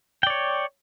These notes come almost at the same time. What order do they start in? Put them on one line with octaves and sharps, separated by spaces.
G5 D5 C#5